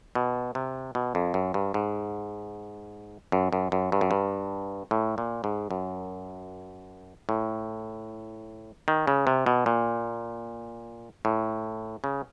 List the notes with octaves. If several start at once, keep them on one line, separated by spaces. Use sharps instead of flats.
B2
C3
B2
F2
F#2
G2
G#2
F#2
F#2
F#2
G2
F#2
G2
A2
A#2
G#2
F#2
A2
D#3
C#3
C3
B2
A#2
A2
C#3